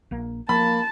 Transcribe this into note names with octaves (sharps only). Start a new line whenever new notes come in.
A#1 A#3
F3 A#3 A5 B5